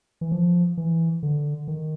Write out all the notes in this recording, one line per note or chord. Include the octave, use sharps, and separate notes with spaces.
E3
F3
E3
D3
D#3